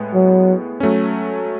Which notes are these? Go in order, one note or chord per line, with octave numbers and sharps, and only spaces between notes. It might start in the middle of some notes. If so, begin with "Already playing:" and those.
Already playing: A2 G#3 B3
F#3
F#3 A3 C#4